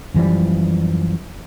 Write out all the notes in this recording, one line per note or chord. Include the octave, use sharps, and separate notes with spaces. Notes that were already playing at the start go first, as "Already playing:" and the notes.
F#2 E3 F3 G3